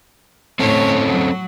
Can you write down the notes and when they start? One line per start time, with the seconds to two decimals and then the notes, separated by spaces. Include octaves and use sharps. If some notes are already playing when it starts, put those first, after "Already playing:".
0.59 A2 C4 C#4 A4 C#5
1.05 F#3